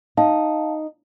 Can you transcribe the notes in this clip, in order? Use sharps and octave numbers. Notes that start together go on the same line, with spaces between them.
D#4 F5 A5